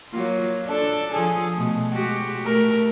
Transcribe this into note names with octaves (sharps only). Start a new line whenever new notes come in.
F#3 A#3 F4
D4 A4
F3 G#4 A4
B2 A3
G#3 F#4 G4
A3 A#4